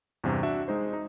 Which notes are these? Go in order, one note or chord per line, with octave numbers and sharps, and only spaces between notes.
E2 G2 C3
D4 F#4 E5
G#3 D#4 C5
D#4